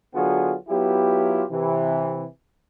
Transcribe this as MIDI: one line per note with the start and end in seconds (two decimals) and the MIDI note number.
0.15 0.55 50
0.15 0.55 54
0.15 0.55 59
0.15 0.55 65
0.15 0.55 66
0.15 0.55 68
0.69 1.43 54
0.69 1.43 59
0.69 1.43 64
0.69 1.43 65
0.69 1.43 67
1.51 2.24 48
1.51 2.24 52